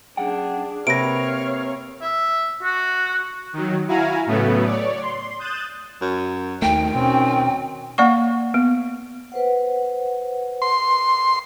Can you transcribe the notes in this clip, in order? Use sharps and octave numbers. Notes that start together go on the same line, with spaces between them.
F#2 D4 G#4 F#5 G5
C3 A#3 B4 C#5 F5 A#6 D7
E5
F#4
D#3 F#3
E4 F#4 F5 G#5 A#5
A2 C#3 F#3 A3 B3
C#5 D5
C6
D#6 F#6 G6 A6 E7
F#2
D#2 D#3 A3 G5
B2 C4 C#4
A#3 D5 F#5 C#6
B3
B4 C5 F#5
C6